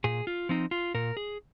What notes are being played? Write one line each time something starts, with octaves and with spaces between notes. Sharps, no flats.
A#2 G#4
F4
F3 C4 D#4
F4
A#2 A#4
G#4